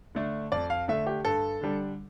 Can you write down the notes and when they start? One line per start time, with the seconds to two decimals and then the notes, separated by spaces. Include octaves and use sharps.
0.15 D3 A3 D4
0.52 F2 D5
0.70 F5
0.88 D3 A3 D4 E5
1.07 G4
1.25 G2 A4
1.61 D3 G3 D4